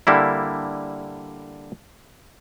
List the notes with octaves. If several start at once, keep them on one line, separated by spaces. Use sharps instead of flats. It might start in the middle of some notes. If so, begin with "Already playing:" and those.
D3 G3 A#3 E4